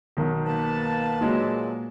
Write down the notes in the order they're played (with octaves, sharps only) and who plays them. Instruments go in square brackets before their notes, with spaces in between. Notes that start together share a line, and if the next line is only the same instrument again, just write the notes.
[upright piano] B1 D#3
[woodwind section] A#3 B4 A5
[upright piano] A#2 F#3 G#3